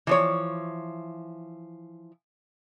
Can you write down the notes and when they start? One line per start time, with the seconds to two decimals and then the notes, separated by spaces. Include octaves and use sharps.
0.07 E3 F3 C#5